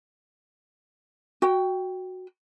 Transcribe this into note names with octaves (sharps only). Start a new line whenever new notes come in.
F#4 G5